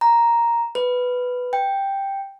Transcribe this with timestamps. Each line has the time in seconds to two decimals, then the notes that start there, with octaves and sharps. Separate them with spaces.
0.01 A#5
0.75 B4
1.53 G5